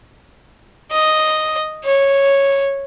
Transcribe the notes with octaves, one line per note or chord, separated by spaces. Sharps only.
D#5
C#5